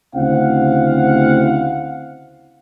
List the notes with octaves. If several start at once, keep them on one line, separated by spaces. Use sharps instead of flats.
D2 C#3 C4 E4 F5 F#5